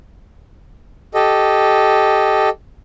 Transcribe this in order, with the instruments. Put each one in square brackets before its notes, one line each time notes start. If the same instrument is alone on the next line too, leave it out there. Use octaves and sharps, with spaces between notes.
[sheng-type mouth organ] G4 A4 D#5